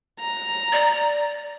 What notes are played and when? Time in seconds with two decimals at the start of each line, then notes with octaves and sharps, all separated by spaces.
0.20 A#5
0.73 D5